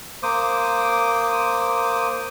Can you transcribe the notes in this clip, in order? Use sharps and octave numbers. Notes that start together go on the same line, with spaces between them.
A#3 C5 D6 D#6